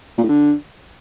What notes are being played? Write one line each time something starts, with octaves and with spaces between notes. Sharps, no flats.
A#2
A2
D3